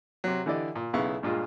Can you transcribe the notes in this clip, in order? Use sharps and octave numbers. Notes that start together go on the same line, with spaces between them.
C3 F#3
D3 E3 E4 G4 D5 D#5
A#2
B1 C#3 B3 E4 F5 C#6
G2 A#2 G#3 F4